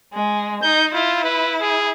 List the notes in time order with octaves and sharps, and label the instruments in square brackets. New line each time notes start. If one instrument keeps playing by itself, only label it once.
[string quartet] G#3
[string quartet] D#4 [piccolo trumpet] G6
[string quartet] E4 [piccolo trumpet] F4
[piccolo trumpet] B4
G#4